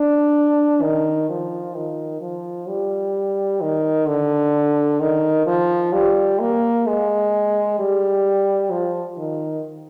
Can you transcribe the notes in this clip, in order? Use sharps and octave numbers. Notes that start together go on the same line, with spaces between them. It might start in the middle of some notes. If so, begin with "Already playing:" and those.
Already playing: D4
D#3
F3
D#3
F3
G3
D#3
D3
D#3
F3
G3
A#3
G#3
G3
F3
D#3